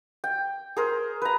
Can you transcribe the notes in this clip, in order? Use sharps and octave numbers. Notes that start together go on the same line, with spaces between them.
G5
G#4 A#4 C5
B4 A#5